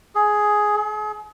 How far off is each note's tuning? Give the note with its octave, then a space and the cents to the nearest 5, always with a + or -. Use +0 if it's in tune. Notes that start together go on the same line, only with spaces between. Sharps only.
G#4 +10
G#4 +35